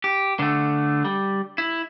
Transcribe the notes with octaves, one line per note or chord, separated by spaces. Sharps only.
G4
D3 A3
G3
E4